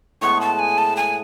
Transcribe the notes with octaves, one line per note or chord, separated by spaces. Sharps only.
A2 G#3 B3 C#6
A5
G#5
A5
G#5